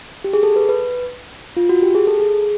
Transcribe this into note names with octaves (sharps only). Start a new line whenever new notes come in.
G4
G#4
A4
B4
B4
F4
F#4
G4
G#4
A4
G#4